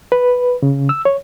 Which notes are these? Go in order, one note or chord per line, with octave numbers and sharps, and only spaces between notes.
B4
C#3
E6
C#5